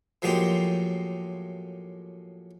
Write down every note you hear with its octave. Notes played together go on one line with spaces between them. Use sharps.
A2 F3 F#3 G#3 A#3 G4